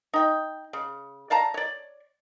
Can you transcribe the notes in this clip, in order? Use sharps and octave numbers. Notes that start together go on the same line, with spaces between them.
D#4 G5
C#3
D5 F5 A5 A#5
C#5 D5